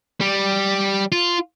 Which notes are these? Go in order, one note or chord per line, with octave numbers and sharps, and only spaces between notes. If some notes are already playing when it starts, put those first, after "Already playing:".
G3
F4